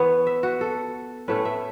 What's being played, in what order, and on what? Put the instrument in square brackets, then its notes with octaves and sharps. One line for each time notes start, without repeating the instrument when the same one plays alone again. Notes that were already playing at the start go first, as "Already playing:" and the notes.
Already playing: [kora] E3 B3 C#5
E5
F#4
A4
A2 A3 C#4 B4
E5